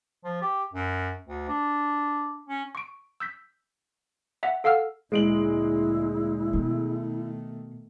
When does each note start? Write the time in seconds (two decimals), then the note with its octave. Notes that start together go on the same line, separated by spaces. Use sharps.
0.24 F3
0.42 G4
0.73 F#2
1.27 D2
1.48 D4
2.48 C#4
2.75 C#6 D7
3.20 E6 G6 B6
4.43 E5 F#5
4.64 A4 F5 F#5 E6 F6
5.12 D2 A#2 G#3 E4 D7 F#7
6.53 B2 D#3 A3